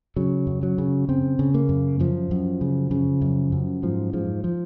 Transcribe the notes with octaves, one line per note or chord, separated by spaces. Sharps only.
C#3 F#3
F#2
F#3
C#3
C#3 C4
C#3
A#3
F#2
F#2 F3
F#2
C#3
C#3
F#2
F#2
G#2 F3
G#2 F3
F3